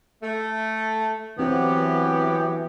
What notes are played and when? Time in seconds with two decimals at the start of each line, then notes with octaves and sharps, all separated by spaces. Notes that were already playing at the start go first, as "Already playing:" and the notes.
0.23 A3
1.39 E3 F#3 B3 C4 G4